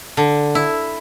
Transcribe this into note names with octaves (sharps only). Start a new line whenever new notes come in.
D3
E4